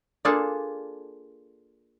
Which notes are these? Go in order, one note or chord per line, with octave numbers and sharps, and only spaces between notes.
A#3 D4 F4 G#4 A4 A5